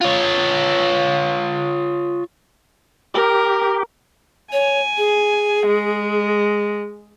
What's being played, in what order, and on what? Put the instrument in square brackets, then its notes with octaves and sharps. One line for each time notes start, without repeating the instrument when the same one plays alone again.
[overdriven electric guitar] F4 C#5
[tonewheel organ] G4 [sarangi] A#4
[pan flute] C#5 [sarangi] G#5
[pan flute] G#4
[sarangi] G#3